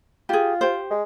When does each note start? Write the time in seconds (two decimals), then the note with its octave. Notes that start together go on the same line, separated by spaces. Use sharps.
0.29 F4 G4 G#4
0.61 G4 C5
0.91 G#3